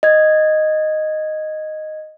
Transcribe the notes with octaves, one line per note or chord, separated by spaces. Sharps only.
D#5 G#6